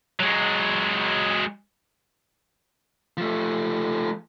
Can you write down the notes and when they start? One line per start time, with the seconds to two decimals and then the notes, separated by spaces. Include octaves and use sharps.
0.20 F#3 G#3
3.17 F3 A3